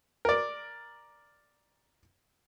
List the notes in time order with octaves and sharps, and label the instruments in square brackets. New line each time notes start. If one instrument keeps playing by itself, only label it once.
[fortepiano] A#4 D5